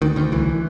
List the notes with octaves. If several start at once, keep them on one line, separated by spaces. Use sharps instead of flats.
D2 D#3
D2 D#3
C2 E3